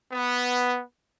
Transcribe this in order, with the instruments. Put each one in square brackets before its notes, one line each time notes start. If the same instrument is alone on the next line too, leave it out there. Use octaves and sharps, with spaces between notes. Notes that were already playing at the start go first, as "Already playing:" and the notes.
[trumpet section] B3